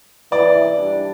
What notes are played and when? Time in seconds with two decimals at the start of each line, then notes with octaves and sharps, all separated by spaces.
0.32 E3 D5
0.77 G3 D4